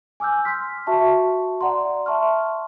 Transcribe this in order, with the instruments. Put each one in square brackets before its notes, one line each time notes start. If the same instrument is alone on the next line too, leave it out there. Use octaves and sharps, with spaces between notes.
[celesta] G#5 D6 E6 F6 G6
C6 F6 B6
F#4 E5 A5 C#6
D5 F#5 A#5 C6
E5 A5 C6 C#6 F6